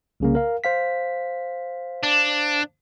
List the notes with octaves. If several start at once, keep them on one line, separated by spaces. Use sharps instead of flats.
C2 C#3 A#3
A#4 F5
C5 F5 B6
D4